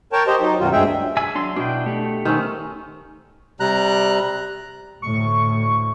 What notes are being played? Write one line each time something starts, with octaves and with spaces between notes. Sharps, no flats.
A#4 C#5 G5 A5
G4 C5 D#5
F#3 D#4
F#2 B2 D#3 F#3 F4 F#4
D2 G2 G#3 G#4 E5 G5
E5 G#5 E6
F#3 D4 C6
B2 D4 E4 G5
A3 G4
D#3 C4 C#4
C3 G3 A#5 F#6
D2 A2 C#6